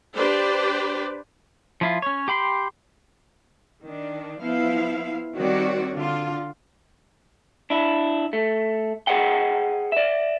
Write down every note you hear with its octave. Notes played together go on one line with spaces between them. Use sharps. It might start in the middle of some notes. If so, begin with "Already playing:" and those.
D4 G4 B4 C5 D5
F3 E4 F4
C#4 C#5
G4 G5 B5 C6
D#3 D4
F3 B3 E4 F5
D#3 G3 C4 F#4 C#5 D5
D3 F4
D4 E4
A3
G#4 A#4 C5 D#5 F#5 G5
D5 E5